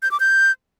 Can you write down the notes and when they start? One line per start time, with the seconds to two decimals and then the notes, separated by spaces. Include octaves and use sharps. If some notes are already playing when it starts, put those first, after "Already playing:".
0.02 G6
0.11 D6
0.20 G6